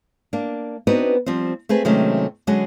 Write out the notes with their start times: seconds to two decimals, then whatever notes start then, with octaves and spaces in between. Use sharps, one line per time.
0.33 A#3 D4
0.87 B3 C4 D4 D#4 F#4 B4
1.26 F3 G3 C4
1.69 A3 C4 G#4 B4
1.85 C3 D#3 F#3 G#3 A3 C#4
2.47 D3 F#3 G#3 C#4 F#4 G#4